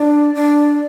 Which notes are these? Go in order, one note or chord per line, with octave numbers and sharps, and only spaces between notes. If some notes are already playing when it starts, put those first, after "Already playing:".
Already playing: D4 D5
D4